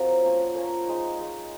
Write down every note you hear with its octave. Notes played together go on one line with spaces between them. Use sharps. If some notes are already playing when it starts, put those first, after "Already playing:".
Already playing: F#3 C4 F4 A#4 C5 D#5
F3 A#3 C#4
F3 A#3 C#4 A#4
G#3 D#4
G#3 D#4